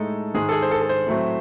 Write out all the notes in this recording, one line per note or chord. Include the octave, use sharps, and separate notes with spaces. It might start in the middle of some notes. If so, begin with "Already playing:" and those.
Already playing: A2 G#3 D#4 A4
G#2 D#3 G#3 G#4
A4
G#4
C5
A4
A4
C5
A2 F#3 A3 C4